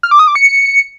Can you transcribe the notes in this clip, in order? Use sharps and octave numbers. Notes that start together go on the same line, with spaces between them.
F6
D6
D#6
D6
C#7